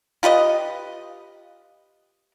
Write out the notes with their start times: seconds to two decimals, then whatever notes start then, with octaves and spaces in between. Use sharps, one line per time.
0.23 F4 G4 B4 D#5